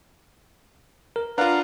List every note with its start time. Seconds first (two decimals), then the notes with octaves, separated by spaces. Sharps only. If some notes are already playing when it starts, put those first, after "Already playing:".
1.16 A#4
1.38 D4 F4 B4 F5 F#5 A#5